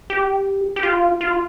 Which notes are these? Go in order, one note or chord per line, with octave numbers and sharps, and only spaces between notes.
G4
G4
F4
F4